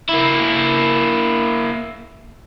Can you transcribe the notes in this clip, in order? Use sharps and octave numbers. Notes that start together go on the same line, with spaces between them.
A#3 E4